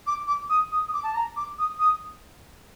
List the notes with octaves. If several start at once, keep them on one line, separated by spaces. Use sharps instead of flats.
D6
D6
D#6
D#6
D#6
D6
A5
A#5
D6
D#6
D#6